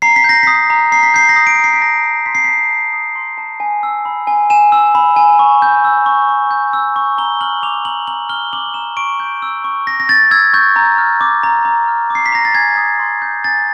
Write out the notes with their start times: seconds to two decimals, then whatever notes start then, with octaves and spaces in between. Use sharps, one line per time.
0.02 A#5 C7
0.16 B6
0.24 G6 A#6
0.43 D#6 B6
0.70 A#5
0.92 A#5 C7
1.03 B6
1.14 G6 C7
1.29 A#6
1.36 D#6 B6
1.47 D7
1.55 C#7
1.59 A#5 C7
1.73 B6
1.81 A5 A#6
2.04 D#6
2.26 C6 B6
2.35 C7
2.45 A5 B6
2.70 A5
2.93 D#6
3.15 C6
3.38 A5
3.60 G#5
3.83 E6
4.05 B5
4.27 G#5
4.50 G#5 E7
4.72 E6
4.95 B5
5.16 G#5
5.39 C#6
5.62 G6
5.85 E6
6.06 C#6
6.29 C#6
6.51 G6
6.73 E6
6.96 C#6
7.18 A#5 G7
7.41 F6 F#7
7.63 D6 F7
7.74 F7
7.85 A#5 F#7
8.07 A#5 F#7
8.29 F6 G7
8.53 D6 F#7
8.74 A#5 E7
8.97 C#6 D7
9.20 G6
9.42 E6
9.64 C#6
9.87 C#6 A#6
10.00 A#6
10.08 G6 A6
10.31 E6 G#6
10.53 C#6 G6
10.76 A#5
10.98 F6
11.21 D6
11.43 A#5
11.65 A#5
11.88 F6
12.10 D6
12.15 C7
12.26 B6
12.32 A#5 A#6
12.45 A6
12.55 G#5 G#6
12.77 D#6
12.99 C6
13.22 G6
13.44 G#5 A6